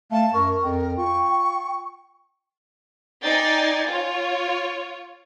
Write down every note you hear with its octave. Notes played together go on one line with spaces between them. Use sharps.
A3 F5 A5
F#2 A#4 C#6
F2 G5
F4 C#6
D#4 D5 G5 G#5 A6 C7
F4 C#5